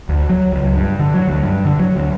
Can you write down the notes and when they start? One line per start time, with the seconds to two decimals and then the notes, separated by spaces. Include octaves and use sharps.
0.09 D2
0.29 F#3
0.52 C#2
0.74 G2
1.00 D3
1.14 F#3
1.27 D2
1.43 G2
1.65 D3
1.79 F#3
1.96 D2